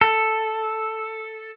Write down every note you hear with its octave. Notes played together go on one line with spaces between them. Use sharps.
A4